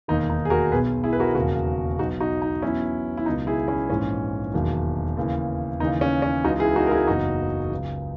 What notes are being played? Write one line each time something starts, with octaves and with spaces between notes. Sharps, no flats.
E1 D#2 D#3 D#4
D#4
G#4
F#4 A#4
B1 B2 F#3 G#4 B4
E4 G#4
B4
F#4 A#4
E1 D#2 C#3 F#4 A#4
B1 B2 F#3 D#4 F#4
D#4 F#4
D#4
E2 B2 F#3 C#4 E4
E4
C#2 B2 F#3 D#4
E4 G#4
C#4 E4
A#1 G#2 E3 C#4
E1 D#2 D#3 F#3
D#2 C#3 E3
D#2 C#3 E3 D#4
C#4
C#4
C#2 C#3 E3 D#4 F#4
E4 G#4
D#4 F#4
A#4
E4 G#4
F#1 E2 C#3 F#3 D#4 F#4
C#2 C#3 F#3